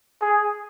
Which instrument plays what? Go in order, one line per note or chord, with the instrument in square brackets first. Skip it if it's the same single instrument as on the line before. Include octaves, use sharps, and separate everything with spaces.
[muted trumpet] G#4